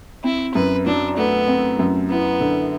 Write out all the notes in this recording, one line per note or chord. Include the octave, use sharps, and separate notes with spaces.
C4 E4
F#2 B4
F#3 D4
A3 B3
C4
F#2
B3 E4
D3